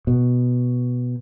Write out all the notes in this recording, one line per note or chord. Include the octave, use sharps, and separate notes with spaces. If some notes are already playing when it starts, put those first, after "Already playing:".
B2